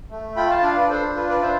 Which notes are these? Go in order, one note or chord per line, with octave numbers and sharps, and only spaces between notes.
A3
F4 G5 B5
F5 A5
D4 D5 F5
B4 D5
D4 A4 C5
F4 B4
B4 D5
D4 C5 E5